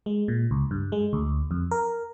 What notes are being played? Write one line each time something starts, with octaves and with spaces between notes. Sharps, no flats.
G#3
A#2
C#2
G2
G#3
D2
F2
A#4